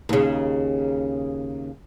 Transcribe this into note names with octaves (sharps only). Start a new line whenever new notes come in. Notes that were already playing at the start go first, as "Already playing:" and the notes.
D#2 C#3